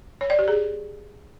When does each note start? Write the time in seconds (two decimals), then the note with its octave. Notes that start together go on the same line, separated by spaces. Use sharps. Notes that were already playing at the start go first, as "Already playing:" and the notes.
0.21 C#5
0.30 D5
0.39 G4
0.48 G#4